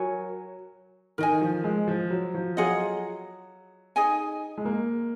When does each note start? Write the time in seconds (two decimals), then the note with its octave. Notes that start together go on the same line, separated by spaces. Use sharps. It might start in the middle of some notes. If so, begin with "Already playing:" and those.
Already playing: F#3 F#4 A#4 C#5 G#5
1.18 D#3 A#4 D#5 G#5
1.41 F3
1.64 G#3
1.88 F3
2.11 F#3
2.34 F3
2.57 F#3 F4 G#4 D#5 F#5
3.96 D#4 G#4 D#5 G#5
4.58 G#3
4.65 A#3